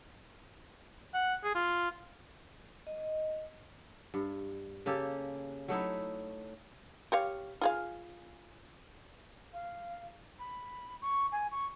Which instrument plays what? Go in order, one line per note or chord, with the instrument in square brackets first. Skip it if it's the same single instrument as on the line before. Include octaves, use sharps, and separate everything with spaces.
[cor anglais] F#5
G#4
F4
[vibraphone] D#5
[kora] G2
C#3 A#3 G4 A4
F#3 A3 D#4 E4
[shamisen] G4 C#5 F5
F4 G#4 F5
[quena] F5
B5
C#6
G#5
C#6